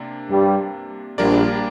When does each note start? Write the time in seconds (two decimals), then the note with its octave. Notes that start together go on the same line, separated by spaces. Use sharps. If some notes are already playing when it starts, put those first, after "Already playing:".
Already playing: C3 A#3 D4
0.30 G2 G3
1.18 A#1 A#2 G3 A#3 D4 A#4 D5